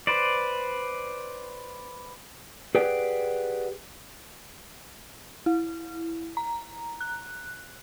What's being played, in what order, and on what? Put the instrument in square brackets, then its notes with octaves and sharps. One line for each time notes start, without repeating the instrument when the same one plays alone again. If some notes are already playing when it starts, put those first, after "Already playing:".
[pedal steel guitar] B4 C5 D5
[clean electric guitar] G4 G#4 B4 D5 F#5 G5
[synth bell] E4
A#5
F#6